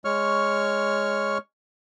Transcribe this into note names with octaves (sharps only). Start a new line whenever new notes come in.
G#3 C#5 C#6 F6